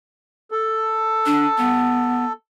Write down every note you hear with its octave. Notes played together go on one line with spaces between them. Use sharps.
A4
D4
B3